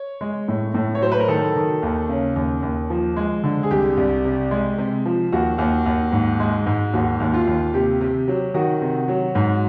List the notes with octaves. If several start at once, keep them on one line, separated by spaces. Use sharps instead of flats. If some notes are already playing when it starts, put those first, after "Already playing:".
Already playing: C#5
G#3
A2
A2
C#5
F#3 C5
B4
A#4
D#3 A4
D#3
D#2
C#3
D#2
D#2
F3
G#3
D3
G#4
C2 G4
C2
C3
G#3
C3
F3
D#2 F#4
D#2
D#2
G#2
G#3
G#2
D#2 F#4
D#2
F4
D#2
C3 G4
C3
F#3
D#3 F#4
C3
F#3
G#2